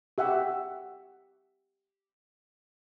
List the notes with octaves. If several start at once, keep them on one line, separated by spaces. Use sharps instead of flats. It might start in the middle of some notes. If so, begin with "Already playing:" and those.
G4 E5 F#5